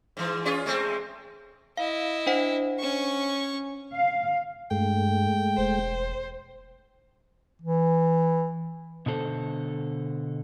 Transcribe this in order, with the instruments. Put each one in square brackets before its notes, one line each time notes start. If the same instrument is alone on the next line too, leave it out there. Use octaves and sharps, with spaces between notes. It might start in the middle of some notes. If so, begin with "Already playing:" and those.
[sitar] G#2 E3
C#4 F4 G#4
G#3 A3 C4
[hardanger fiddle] E4 D#5 [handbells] F5
[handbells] D4 C5 F#5
[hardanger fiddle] C#4 C#6
[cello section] F5
[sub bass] G2 [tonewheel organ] G#3 A3 [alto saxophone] G5
[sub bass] E1 [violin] C5
[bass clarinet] E3
[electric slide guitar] B2 D3 A4 C5